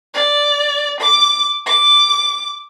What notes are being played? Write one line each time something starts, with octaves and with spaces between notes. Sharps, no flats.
D5
D6
D6